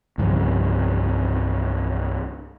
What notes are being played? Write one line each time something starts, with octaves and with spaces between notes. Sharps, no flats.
C2 G2 C#3 F3